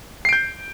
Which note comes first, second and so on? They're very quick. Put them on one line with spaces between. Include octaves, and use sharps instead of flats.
C7 D7 G6